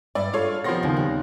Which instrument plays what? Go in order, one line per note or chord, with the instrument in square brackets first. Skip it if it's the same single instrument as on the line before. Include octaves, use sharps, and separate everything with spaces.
[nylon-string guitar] G2 B4 E5 [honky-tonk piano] D5
[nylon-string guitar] D4 A4 [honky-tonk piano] F4 C#5 F5
[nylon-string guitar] C3 D#3 B3 [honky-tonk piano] F3 C6 A#6
[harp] D#2 C#3 C4
[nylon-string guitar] G3 [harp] F#6